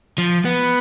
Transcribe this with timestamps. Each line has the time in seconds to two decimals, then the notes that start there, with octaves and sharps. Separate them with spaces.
0.18 F3
0.45 B3